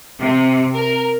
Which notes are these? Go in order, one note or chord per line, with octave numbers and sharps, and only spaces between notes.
C3
A#4